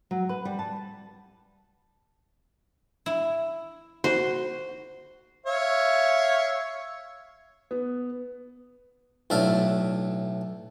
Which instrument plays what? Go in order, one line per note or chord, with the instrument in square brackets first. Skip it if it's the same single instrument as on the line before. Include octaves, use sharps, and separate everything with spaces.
[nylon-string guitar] F#3
B4
G3
A5
[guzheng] E4
[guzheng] F#4 [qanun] C5
[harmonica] C#5 E5 F5
[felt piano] B3
[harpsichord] B1 A2 D4 E5 F5